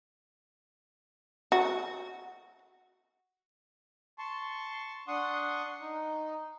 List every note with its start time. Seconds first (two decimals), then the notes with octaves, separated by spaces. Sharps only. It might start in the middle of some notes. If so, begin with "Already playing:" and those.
1.52 F#4
4.18 A5 C6 C#6
5.08 D4 F#5 C6 C#6 D#6
5.81 D#4